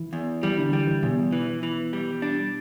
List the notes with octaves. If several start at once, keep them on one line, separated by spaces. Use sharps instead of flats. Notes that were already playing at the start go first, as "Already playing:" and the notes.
Already playing: E3 E4
E2
E3 G3 E4
D3 D4
E3 G3 E4
E3 E4
E2 B2 B3
E3
E3
G3
D4